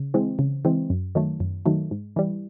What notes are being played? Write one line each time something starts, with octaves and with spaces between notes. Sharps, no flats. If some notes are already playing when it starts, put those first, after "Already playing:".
Already playing: C#3
E3 G#3 C4
C#3
E3 G#3 C4
F#2
D#3 F#3 A3
F#2
D#3 F#3 A3
G#2
E3 G3